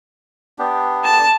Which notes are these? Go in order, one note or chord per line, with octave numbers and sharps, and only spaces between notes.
B3 D4 G4
A5